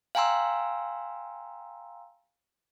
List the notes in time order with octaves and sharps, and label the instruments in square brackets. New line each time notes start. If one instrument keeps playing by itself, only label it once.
[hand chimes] F5 G5 G#5 A#5 C6 E6